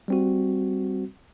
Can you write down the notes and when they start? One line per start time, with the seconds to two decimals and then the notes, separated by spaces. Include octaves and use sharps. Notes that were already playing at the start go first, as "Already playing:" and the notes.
0.08 G3 C4 F#4